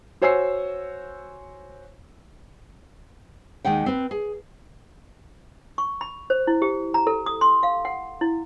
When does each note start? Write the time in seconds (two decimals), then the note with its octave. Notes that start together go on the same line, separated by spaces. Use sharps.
0.22 F#4 C5 C#5 G#5 E6 C7
3.65 D#2 D#3 G#3 F#5 G5
3.86 C4 B4
4.11 G#4
5.78 C#6
6.01 B5
6.30 C5
6.47 E4
6.62 G4
6.94 A#5
7.07 A4
7.26 D#6
7.41 C6
7.63 F5
7.85 F#5
8.21 E4